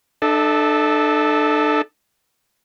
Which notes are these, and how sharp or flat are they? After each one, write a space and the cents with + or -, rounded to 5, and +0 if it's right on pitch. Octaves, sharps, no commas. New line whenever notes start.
D4 +40 A4 -5 E5 -20